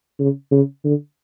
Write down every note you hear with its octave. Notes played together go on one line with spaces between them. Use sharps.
C#3
C#3
D3